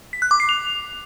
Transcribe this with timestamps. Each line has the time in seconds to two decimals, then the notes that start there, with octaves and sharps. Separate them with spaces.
0.13 B6
0.22 F#6
0.31 D6
0.40 C7
0.49 F7